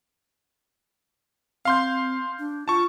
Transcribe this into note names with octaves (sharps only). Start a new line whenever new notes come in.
C4 F5 C6 G6
D4
F4 A5 C#6